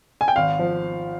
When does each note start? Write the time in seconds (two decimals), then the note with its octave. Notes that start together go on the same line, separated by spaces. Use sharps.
0.21 G#5
0.28 G5
0.36 G#1 F5
0.59 F3